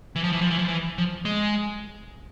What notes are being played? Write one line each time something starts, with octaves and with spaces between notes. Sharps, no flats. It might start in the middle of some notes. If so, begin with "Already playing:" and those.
E3
F3
E3
F3
E3
F3
E3
F3
G#3